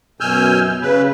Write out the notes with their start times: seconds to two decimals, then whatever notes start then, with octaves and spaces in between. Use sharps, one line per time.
0.20 F#2 B2 G#5 E6 F6 G6
0.82 C#3 B4